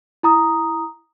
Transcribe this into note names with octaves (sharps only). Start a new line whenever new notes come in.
E4 A#5 D#6